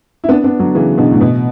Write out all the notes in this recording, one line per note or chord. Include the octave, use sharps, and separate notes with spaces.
E4
B3 D4
B3 D4
D3 F#3
C#3 E3
B2 D3
A2
B2